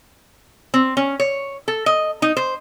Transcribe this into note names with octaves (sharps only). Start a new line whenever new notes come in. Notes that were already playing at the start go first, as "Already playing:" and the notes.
C4
C#4
C#5
A4
D#5
D#4
C5